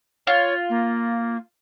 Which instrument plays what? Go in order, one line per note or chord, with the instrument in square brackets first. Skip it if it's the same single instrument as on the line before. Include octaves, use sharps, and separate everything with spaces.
[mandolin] F4 [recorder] C#5
[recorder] A#3